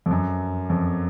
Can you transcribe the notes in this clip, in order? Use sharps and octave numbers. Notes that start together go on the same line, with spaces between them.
F2
F#2
F2